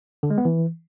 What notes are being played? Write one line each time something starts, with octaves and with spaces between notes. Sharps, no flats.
D3
G#3
B3
E3